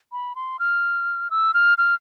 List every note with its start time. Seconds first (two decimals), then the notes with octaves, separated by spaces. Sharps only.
0.12 B5
0.36 C6
0.59 F6
1.31 E6
1.54 F6
1.78 F6